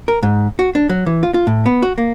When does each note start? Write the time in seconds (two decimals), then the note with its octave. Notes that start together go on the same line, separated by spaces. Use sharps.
0.08 A#4
0.23 G#2
0.59 F#4
0.75 D4
0.89 F#3
1.06 E3
1.23 F4
1.34 F4
1.47 A2
1.66 B3
1.82 F#4
1.98 A#3